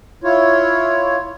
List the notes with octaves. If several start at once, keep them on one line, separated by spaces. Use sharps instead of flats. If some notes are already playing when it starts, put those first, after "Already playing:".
E4 F4 C#5